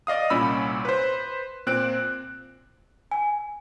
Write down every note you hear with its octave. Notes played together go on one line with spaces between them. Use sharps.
D5 D#5 F5 D#6
C2 A#2 C#4 B5 E6
B4 C5
A#2 C4 F#6 D7
G#5